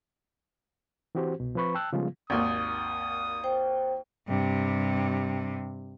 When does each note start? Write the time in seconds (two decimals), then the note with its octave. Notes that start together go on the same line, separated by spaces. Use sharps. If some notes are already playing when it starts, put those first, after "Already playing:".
1.15 E3 C4 F#4 G4 C5
1.40 C2 B2
1.55 F3 C4 B4 B5 C#6
1.75 G5 A5 E6 F#6
1.93 C#3 F3 G3 G#3 B3 F4
2.30 G#1 D#2 D#6
3.44 C5 G5
4.28 G2 C3